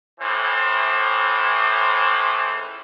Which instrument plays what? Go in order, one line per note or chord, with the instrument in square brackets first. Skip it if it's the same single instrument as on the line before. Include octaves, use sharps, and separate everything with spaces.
[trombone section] C#2 A2 E3 C5